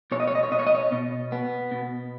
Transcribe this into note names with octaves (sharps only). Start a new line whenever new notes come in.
B2 C#5
D#5
C#5
D#5
C#5
B2 D#5
C#5
D#5
C#5
B2
B3
B2